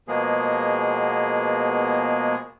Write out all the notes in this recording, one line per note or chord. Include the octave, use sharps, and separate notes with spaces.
B2 F3 G#3 A#3 B3 G#4